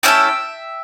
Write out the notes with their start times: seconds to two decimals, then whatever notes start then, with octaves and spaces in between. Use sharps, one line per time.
0.03 A3 C#4 E4 A4 E5 G5